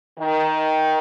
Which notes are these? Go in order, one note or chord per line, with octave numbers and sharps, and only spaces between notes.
D#3